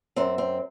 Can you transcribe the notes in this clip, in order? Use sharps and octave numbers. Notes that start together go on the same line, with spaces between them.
F#2 C4
C4